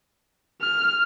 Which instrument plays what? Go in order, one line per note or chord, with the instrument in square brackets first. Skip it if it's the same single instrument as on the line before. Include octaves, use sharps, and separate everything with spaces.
[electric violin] F6